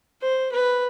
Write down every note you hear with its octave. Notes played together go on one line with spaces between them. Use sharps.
C5
B4